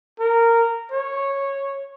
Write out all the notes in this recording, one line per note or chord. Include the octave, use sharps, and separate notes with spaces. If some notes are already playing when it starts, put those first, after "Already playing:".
A#4
C#5